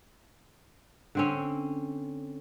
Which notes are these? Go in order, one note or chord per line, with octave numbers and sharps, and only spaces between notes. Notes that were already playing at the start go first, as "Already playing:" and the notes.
D3 C4 C#4